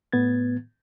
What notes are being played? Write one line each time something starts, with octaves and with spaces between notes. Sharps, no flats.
A2 B3 G#6 A6